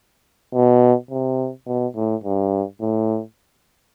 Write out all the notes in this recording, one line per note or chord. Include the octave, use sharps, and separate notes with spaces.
B2
C3
B2
A2
G2
A2